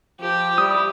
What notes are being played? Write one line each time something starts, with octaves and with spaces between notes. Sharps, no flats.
F3 G4
G3 E4 D#6